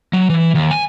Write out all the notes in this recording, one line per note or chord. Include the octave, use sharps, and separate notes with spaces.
F#3
E3
D#2
G#5